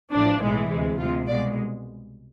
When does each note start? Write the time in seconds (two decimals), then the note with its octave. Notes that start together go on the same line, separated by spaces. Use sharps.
0.13 A1 A2 F3 D4
0.41 B1 A2 E3 G#3
0.70 D2 C3 G#3
0.99 D2 C3 G#3 F4
1.27 C2 B2 G#3 D5